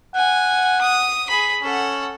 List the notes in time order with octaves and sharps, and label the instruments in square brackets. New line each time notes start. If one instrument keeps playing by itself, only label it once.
[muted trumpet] F#5 [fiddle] G#5
[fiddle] D#6
G#4 B5
[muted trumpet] C#4 [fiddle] A4 F#5